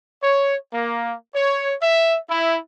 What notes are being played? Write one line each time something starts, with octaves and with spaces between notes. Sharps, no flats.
C#5
A#3
C#5
E5
E4